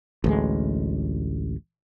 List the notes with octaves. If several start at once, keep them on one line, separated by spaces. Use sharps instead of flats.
A1 D2 G#3